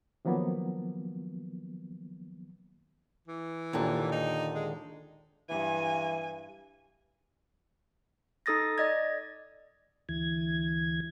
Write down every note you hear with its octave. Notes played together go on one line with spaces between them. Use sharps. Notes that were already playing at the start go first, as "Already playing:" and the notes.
D#3 F3 F#3 A#3 B3
E3
D#2 A#2 D3
D#4
G#3
G2 E3 G#5
D#4 A4 D#6 A6 A#6
D5 D#5 G#6
D2 E3 G#6